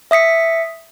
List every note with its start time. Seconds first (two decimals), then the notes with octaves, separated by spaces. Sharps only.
0.11 E5 D#6 B6 C#7